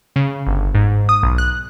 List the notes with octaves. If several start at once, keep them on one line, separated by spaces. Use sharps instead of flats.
C#3
G1
G#2
D#6
B1
F#6